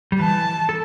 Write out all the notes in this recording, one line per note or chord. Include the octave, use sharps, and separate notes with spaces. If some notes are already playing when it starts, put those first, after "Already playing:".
G3
E3 A5
A4